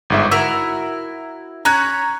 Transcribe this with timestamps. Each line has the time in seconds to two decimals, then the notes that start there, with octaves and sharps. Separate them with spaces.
0.10 G1 G#2 E5
0.31 E4 F#4 A#4 E6
1.65 C#4 C#5 A#5 F#6 G#6